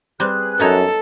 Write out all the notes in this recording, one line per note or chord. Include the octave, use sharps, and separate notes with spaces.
G3 C4 G#4 B4 F#6
F#2 B3 D#4 A4 C#5